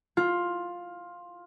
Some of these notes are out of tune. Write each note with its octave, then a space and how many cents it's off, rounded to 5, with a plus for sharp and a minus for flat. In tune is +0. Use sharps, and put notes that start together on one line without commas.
F4 +10